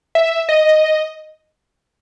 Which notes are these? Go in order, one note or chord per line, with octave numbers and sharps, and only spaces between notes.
E5
D#5